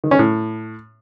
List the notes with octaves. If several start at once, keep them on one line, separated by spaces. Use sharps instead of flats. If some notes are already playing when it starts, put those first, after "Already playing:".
D#3
C#4
A2